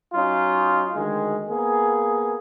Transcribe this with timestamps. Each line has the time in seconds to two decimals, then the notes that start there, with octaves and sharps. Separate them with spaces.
0.14 F#3 C#4 D#4 F4
0.94 D2 D#3 G#3
1.49 A#3 B3 G#4